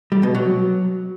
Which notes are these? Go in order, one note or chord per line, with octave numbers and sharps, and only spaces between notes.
G3
B2
F#3